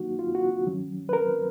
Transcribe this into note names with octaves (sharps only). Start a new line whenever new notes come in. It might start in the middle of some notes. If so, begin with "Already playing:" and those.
Already playing: D#3 F#3 A#3 D#4 F#4
F4
F#4
D#3 F#3 C#4
B4
A#4